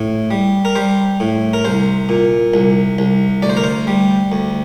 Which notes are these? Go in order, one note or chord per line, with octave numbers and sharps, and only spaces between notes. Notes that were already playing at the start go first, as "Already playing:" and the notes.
Already playing: A2
G3
A#4
G3 C5
A2
A#4
C2 C5
A#2
C2
C2
D2 D5
C5
A#4
C5
G3
D2